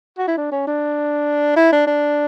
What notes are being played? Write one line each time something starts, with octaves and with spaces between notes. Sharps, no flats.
F#4
E4
D4
C#4
D4
E4
D4
D4